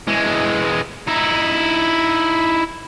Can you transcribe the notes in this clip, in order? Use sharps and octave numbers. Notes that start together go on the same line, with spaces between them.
E3 G#3
D#4 E4